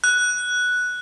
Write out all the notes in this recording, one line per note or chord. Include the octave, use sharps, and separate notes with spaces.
F#6